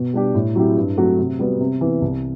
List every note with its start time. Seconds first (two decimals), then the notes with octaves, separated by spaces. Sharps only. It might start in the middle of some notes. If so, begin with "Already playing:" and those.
Already playing: B2
0.14 G3 D4 G4
0.34 A2
0.55 F#3 C4 E4 G4
0.77 G2
0.97 F#3 A3 C4 F#4
1.19 C3
1.39 G3 B3 F#4
1.60 C3
1.81 E3 B3
2.02 C2